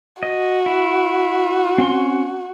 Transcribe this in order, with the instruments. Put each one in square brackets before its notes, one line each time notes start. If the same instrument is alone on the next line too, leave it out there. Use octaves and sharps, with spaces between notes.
[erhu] F#4 [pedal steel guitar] D#5
[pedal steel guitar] E4
C4 C#4 C6